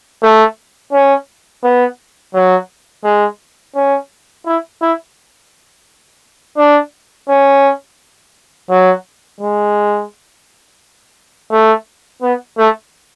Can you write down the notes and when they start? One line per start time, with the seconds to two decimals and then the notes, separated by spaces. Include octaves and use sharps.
0.23 A3
0.93 C#4
1.64 B3
2.34 F#3
3.04 G#3
3.76 C#4
4.46 E4
4.82 E4
6.58 D4
7.29 C#4
8.70 F#3
9.41 G#3
11.51 A3
12.22 B3
12.58 A3